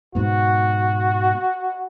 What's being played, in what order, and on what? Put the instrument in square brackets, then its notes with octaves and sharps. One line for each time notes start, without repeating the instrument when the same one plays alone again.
[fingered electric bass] G#2 B2 [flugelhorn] F#4